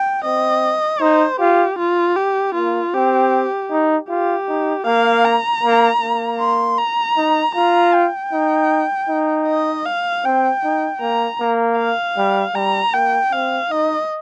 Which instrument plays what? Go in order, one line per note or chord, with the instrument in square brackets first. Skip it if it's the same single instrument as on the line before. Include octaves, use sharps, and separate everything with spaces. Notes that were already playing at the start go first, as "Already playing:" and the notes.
Already playing: [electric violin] G5
[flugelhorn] C4 [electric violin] D#5
[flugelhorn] D#4 [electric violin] C5
[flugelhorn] F4 [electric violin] G4
[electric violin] F4
G4
[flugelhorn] A#3 [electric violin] F4
[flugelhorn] C4 [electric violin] G4
[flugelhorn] D#4
[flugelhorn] F4 [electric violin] G4
[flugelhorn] D#4
[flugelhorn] A#3 [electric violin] F5
[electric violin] A#5
[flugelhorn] A#3
A#3
[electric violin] C6
A#5
[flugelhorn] D#4
[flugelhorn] F4 [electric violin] A#5
[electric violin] G5
[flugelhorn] D#4
D#4
[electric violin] D#5
F5
[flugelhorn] C4 [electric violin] G5
[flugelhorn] D#4
[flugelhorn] A#3 [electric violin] A#5
[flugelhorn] A#3
[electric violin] F5
[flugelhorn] G3
[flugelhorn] G3 [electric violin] A#5
[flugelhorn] A#3 [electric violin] G5
[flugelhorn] C4 [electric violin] F5
[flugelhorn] D#4 [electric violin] D#5